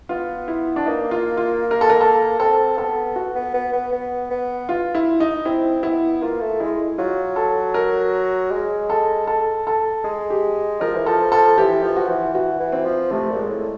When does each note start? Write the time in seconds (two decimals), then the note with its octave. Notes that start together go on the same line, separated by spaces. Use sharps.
0.09 B3 F4
0.48 E4
0.76 D4
0.86 A#3 D#4
1.11 F4
1.37 F4
1.71 A#4
1.81 A4
1.90 A#4
2.01 A4
2.39 C4 A4
2.77 B3 A4
3.16 F#4
3.35 B3
3.54 B3
3.73 B3
3.93 B3
4.31 B3
4.69 F4
4.95 E4
5.20 D#4
5.45 C4 E4
5.83 B3 E4
6.21 A#3 F4
6.40 A3
6.60 G#3 E4
6.98 F#3 F4
7.36 A4
7.74 A#4
8.51 G#3
8.90 A4
9.27 A4
9.67 A4
10.04 G#3 G#4
10.30 G4
10.81 F3 A#4
10.95 E3
11.06 F3 A4
11.32 A4
11.58 E3 G4
11.83 F3
11.97 F#4
12.08 E3
12.34 E3 F#4
12.60 E3
12.72 C4
12.85 F3
13.11 C3 A3
13.30 A#2
13.36 G#3
13.49 A2